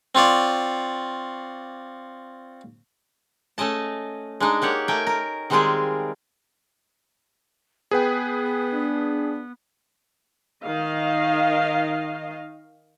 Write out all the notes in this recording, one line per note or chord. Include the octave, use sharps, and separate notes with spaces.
C4 F4 C#5 D5
A3 C#4 D#5 A5
G#3 D4 D#4
A#3 G4 C#5 F#5
A3 A#4 G5 G#5
A#4
D#3 G3 G#3 C4 F4 G#4
B3 G#4 B4 G5
D4
D#3 D#5 F5